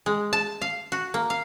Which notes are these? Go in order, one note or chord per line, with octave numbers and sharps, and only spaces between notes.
G#3
A5
F5
F#4
A#3
F5